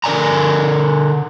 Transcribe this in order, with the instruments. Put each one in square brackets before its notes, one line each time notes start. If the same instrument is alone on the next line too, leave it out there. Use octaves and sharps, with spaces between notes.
[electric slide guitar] D3 A#4 C#5 D5 G#5 A#5